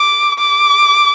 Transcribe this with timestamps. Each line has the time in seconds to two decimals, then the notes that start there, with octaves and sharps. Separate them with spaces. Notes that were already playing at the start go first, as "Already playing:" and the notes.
Already playing: D6
0.39 D6